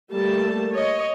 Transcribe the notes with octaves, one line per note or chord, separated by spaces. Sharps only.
G3 A3 A#3 A4 A5
C#5 D#5